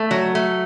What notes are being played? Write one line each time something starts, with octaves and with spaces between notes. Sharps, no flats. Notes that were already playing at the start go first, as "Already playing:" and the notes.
Already playing: A3
F#3
A3